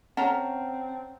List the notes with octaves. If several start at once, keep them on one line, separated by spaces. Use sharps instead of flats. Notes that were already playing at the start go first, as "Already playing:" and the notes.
C4 C#4 F#5 A5 A#5